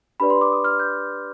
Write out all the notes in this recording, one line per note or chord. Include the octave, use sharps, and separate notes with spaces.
D4 G4 B4 D5 B5
C6
D6
D#6
F6
G6